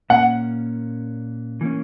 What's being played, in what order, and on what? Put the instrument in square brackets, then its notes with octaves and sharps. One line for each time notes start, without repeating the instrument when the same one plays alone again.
[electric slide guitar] A#2 A#3 C#4 [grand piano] F#5
[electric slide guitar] E3 A#3 C#4